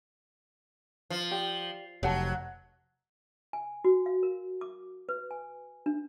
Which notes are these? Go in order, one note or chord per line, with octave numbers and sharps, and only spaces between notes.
F3
G4 D5 G5
F1 F#3 G4 F#5 A5
G#5
F#4
F5
A#4
D6
B4
G#5
D4